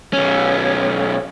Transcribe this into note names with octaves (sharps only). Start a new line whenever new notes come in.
B1 C#4